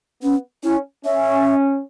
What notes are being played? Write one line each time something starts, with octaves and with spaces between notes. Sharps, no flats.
B3 C#4
C#4 E4
C#4 E5